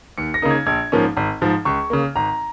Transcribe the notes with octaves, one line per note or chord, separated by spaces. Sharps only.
D#2 C#7
A#6
C#3 A#3 D#4
G#6
A#1 G#6
G#2 F3 A#3 C#4
G#1
G#2 F3
C#2 C#6
C#3 A#3
G#1 A#5